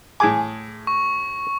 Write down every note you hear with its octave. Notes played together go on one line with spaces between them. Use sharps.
A2 G#4 G#5 D6
C#6